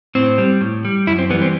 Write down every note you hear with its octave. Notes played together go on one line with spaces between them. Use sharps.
A2 C4
G3
A2
G3
F#2 E4
C4
E3 G3 B3
C4